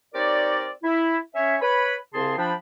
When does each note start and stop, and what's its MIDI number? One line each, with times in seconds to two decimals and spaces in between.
0.14 0.70 60
0.14 0.70 63
0.14 0.70 67
0.14 0.70 70
0.14 0.70 73
0.14 0.70 74
0.84 1.18 64
1.35 1.56 61
1.35 1.56 73
1.35 1.56 76
1.62 1.95 71
1.62 1.95 73
1.62 1.95 83
2.14 2.37 36
2.14 2.37 49
2.14 2.37 60
2.14 2.37 68
2.14 2.37 81
2.14 2.37 84
2.38 2.53 53
2.38 2.53 62
2.38 2.53 79
2.38 2.53 83